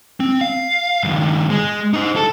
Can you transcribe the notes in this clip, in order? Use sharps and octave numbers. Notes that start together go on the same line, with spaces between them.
C4
F5
G2 D#3
G#3
D#4 C5
A4